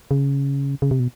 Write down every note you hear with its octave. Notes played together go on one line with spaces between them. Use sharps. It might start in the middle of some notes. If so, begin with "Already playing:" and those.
C#3
C#3
C3
B2